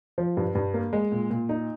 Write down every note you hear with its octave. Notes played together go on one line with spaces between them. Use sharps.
F3
G2
G2
A#3
G#3
A#2
A#2
D#4